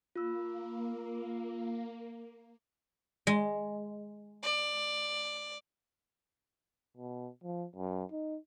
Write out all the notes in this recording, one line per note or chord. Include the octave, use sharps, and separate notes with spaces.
A#3 F4 E6
G#3
D5
B2
F3
F#2
D#4